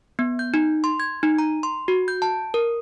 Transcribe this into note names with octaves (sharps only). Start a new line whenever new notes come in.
B3
G6
D#4
C6
G#6
D#4
A#5
C6
F#4
G6
A5
A#4